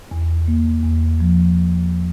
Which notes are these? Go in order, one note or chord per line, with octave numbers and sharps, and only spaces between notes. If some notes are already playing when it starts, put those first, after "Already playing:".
E2
A#3
E2
F3